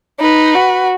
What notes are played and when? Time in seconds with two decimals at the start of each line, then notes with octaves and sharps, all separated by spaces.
0.20 D#4 B4
0.55 F#4